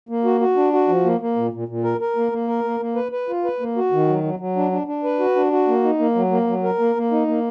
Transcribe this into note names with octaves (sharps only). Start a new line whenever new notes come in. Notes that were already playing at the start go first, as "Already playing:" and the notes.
A#3
F#4
F#4
D4
F#4
F3
A#3
A#3
A#2
A#2
A#2
A#4
A#4
A#3
A#3
A#4
A#3
A#3
B4
B4
F4
B4
A#3
F#4
D#3
F#3
F#3
F#3
D4
D4
D4
B4
F#4
D4
F#4
A#3
D#4
A#3
F#3
A#3
F#3
A#4
A#3
A#3
D#4
A#3